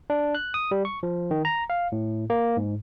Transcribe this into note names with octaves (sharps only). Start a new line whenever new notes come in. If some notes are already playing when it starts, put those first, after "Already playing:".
D4
F#6
D#6
G3
C#6
F3
D#3
A#5
F5
A2
A#3
G#2